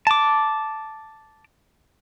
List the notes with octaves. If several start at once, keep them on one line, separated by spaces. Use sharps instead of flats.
A5 D6